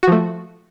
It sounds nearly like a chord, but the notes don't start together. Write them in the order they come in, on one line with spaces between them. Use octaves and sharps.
F#4 F3 A3